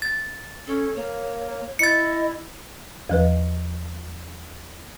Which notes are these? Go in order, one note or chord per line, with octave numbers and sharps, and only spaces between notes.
A6
C#4 A4
A#3 C#5
E4 D#5 A6 C#7
E2 F3 B4